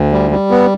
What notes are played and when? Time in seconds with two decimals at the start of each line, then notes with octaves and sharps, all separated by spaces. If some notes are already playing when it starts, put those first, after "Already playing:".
Already playing: D2
0.12 G3
0.31 G3
0.51 B3